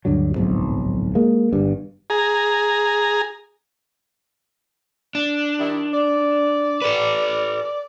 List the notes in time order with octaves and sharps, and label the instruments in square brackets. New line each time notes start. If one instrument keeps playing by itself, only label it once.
[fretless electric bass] D2 G2 D3 F#3
D1 B1 F2 G#2
G#3 A#3
G1 G2
[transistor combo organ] G#4 A#5
[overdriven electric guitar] D4
[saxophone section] D#3 G3 E4
D5
[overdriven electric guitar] A4 B4